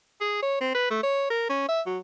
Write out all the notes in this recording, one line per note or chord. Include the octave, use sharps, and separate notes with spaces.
G#4
C#5
C4
B4
A3
C#5
A#4
C#4
E5
F#3